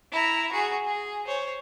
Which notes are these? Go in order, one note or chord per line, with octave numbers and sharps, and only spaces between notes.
E4 A#5
F#4 G#4
G#4
C5 C#5